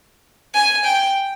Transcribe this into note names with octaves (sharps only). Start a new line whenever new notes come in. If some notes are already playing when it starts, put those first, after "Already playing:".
G#5
G5